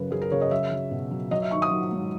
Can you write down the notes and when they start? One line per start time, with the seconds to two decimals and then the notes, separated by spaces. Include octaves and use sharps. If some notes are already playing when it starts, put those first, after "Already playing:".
Already playing: F#2 C#3 B4
0.11 F#2 G#4
0.22 A#4
0.32 C#3 C#5
0.41 D#5
0.51 F#3 E5
0.71 F#3
0.91 B2
1.11 F#3
1.31 F#3 D#5
1.42 E5
1.51 D#3 C#6
1.62 D#6
1.71 F#3
1.91 G#2